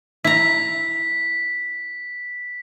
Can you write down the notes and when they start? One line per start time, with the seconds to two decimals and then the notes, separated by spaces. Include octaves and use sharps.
0.25 E4 A#5 B6